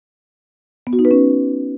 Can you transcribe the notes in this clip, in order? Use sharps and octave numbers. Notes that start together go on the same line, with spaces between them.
B3
F#4
D#4
B4
C#4